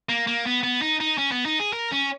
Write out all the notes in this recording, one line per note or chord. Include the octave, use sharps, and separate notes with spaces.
A#3
A#3
B3
B3
D#4
D#4
C#4
B3
D#4
G#4
A#4
C#4